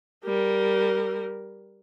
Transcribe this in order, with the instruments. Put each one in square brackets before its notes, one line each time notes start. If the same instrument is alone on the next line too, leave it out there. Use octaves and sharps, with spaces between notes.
[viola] G3 A#4